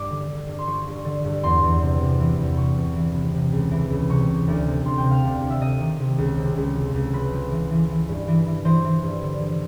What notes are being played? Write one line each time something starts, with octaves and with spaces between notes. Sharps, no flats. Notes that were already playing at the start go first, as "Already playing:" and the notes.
Already playing: G2 D6
D3
G2
G2
C6
F3 C#6
G2
D3
G2
E2 C6
E2
C3
C3
E3
E2
C3 C#6
E2
E3
C3
C3
C#2
E3
C#2
C3 C#6
C3
D2
C3
D2 C6
G5
C3
F5
D2
D2
E5
C3 D#5
D#3
C3
C#2
C3
C#2
F3
C#2
F3 B4
F3
E3
E3
E3
G2
E3
E3
E3 C5
E3
G2
D3
D3